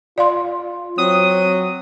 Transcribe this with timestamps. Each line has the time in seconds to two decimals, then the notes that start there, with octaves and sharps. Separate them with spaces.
0.18 F4 D5 F5 C6
0.98 F#3 C4 D#6